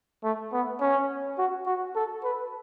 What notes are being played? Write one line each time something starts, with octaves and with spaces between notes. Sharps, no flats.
A3
B3
C#4
F#4
F#4
A4
B4